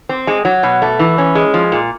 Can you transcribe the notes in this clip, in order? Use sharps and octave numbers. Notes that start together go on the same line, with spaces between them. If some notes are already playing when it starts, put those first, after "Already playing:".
C4
G#3
F#3
B2
A3
E3
C#4
G#3
F3
A#2